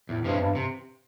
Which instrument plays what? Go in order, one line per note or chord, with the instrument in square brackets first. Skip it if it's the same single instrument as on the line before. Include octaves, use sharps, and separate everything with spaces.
[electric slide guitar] E2 [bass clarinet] A2
[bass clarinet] G2 [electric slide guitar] C3 F3 G#3 C#4
[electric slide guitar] E2 [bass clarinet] G2
[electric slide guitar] C3